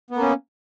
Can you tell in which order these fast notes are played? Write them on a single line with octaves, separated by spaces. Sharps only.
B3 A#3 C#4